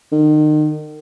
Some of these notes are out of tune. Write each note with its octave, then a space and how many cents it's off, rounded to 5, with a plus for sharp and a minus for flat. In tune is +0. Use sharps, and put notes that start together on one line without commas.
D#3 -35